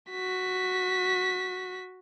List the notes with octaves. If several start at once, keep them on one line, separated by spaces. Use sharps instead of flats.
F#4 B6